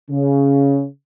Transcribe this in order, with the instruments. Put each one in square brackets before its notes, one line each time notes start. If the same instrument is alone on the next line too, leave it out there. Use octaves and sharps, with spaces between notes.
[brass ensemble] C#3